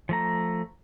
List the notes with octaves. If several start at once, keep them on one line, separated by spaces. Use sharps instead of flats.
F3 A3 A#5